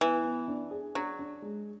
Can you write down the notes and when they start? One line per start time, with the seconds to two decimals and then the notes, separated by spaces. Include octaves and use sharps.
0.01 E3 B3
0.24 B3
0.48 D4
0.71 G#4
0.95 F#3 D4
1.19 D4
1.42 G#3